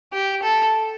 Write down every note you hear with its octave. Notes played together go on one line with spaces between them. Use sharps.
G4
A4